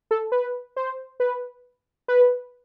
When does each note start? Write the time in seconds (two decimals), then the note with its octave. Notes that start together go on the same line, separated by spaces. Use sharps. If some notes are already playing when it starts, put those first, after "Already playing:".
0.11 A4
0.32 B4
0.77 C5
1.20 B4
2.08 B4